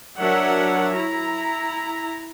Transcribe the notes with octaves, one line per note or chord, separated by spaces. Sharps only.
F#3 D4 A#4 C#5 E5 F#5
E4 A#5